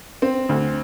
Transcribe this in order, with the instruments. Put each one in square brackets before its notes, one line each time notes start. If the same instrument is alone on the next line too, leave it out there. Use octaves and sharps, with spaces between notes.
[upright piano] C4
D2